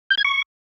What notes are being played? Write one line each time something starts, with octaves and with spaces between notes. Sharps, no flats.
G6
G#6
C#6